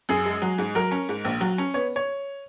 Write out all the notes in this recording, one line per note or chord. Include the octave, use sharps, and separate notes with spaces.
F#2 G#4
G#3
F#3
G#2
F#3 A#4
C#4
G#2
A#1
F#3
C#4
B3 C#5
C#5